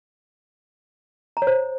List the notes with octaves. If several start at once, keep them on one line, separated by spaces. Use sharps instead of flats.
A#5
C#5
C5